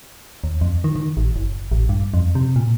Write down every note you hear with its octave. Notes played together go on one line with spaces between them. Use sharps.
D#2
F2
D#3
D#3
A1
F#1
A1
G2
F2
C3
A#2